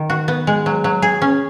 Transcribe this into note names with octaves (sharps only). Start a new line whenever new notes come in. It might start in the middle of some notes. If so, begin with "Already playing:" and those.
Already playing: D#3
F#4
B3
G#3
F#3
F#3
G#4
C#4